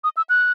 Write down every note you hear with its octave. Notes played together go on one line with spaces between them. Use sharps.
D#6
E6
F#6